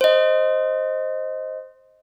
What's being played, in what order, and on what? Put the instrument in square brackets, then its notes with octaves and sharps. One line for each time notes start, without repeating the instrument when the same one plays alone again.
[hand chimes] C5 D#5